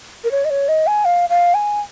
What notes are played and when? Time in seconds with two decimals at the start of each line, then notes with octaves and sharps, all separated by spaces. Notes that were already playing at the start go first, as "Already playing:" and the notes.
0.24 A#4
0.31 C#5
0.45 D#5
0.50 C#5
0.68 D#5
0.87 G#5
1.05 F5
1.30 F5
1.54 G#5